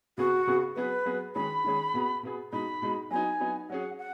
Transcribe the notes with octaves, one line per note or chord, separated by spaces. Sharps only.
C#3 B3 F#4 G#4
C#3 B3 G#4
F#3 B3 G#4 B4
F#3 B3 G#4
D#3 G#3 C#4 G#4 B5
D#3 G#3 C#4 G#4
B2 B3 G#4
B2 B3 G#4
B2 G#3 D#4 B5
B2 G#3 D#4
F#3 B3 D#4 G#5
F#3 B3 D#4
F#3 C#4 G#4 F#5
F#5